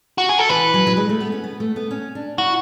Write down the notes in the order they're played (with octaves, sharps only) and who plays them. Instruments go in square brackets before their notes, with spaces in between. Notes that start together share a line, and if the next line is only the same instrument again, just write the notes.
[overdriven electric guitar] F#4
G#4
A4
[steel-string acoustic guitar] E3 [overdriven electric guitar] B4
[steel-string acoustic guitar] F#3
F#3
G#3
A3
B3
C#4
B3
A3
B3
C#4
D4
[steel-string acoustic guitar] E4 [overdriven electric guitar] F#4